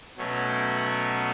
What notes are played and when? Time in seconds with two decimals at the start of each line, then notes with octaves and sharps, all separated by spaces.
0.17 B2 F#3 A3 C#4
0.47 G5
0.77 F#5